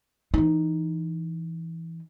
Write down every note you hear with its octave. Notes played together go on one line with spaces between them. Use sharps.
E3 D#4